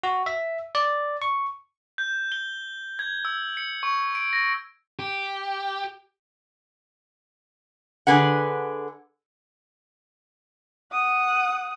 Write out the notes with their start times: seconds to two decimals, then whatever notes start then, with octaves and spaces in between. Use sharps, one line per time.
0.03 F#4
0.26 E5
0.75 D5
1.22 C#6
1.98 G6
2.32 G7
2.99 G#6
3.25 E6
3.57 C#7
3.83 C#6
4.15 D7
4.33 A#6
4.99 G4
8.07 D3 G#4 B4 F#5
10.92 F#5 D#6